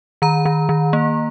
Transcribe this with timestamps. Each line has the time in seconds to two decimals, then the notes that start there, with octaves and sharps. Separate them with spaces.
0.22 D#3 A#5
0.45 D#3
0.69 D#3
0.93 A#3